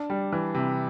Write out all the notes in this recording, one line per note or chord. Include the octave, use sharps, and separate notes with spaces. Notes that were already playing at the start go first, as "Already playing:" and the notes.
Already playing: D4
G3
E3
C3